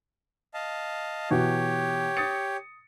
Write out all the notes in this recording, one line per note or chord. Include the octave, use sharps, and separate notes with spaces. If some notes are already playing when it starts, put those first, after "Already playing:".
D#5 F5 A5
B2 E3 F#4 G4 C#5
D#6 A6 C#7